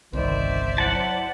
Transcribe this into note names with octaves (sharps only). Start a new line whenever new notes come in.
G1 C2 D#3 C5 D5 E5
F#3 E4 F#5 A5